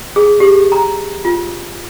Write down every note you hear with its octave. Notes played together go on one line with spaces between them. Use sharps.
G#4
G4
A#5
F4